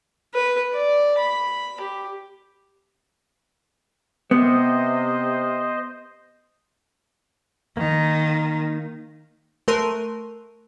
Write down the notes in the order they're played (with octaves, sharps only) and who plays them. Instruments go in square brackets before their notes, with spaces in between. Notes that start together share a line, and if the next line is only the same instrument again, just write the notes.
[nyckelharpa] B4
D5
B5
G4
[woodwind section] C3 [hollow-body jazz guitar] B3 [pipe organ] C5 D#5
[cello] D#3 [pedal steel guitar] A#3 D#4
[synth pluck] A3 A#4 C6 F#6 D#7